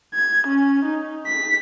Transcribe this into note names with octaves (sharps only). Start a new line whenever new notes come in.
G#6
C#4
D#4
B6